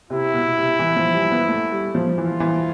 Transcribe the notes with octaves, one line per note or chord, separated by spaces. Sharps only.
C3 E4
B2
C3
E3
F3
G3
B3
A3
G3
F3
E3 F4
E3